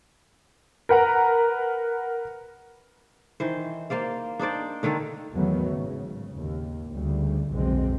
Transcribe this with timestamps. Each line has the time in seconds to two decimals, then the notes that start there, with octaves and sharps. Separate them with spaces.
0.89 A#4 B4 F#5 A#5
3.40 D#3 E3 C5
3.90 A#3 C5 D5 F5
4.39 D4 D#4 C5 D5
4.83 D3 D#3 A#3 A4
5.32 E2 D#3 F#3 A3 B3
5.70 G#1 C#3
6.34 D#2
6.89 D2 C#3 G3
7.52 B1 F2 D3 G#3 C4